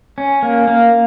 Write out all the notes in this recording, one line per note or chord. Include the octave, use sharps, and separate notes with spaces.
C#4
A#3
A#3